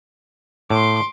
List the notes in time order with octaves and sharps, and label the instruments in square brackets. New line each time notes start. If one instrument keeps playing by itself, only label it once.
[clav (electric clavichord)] A2 [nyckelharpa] C6 D6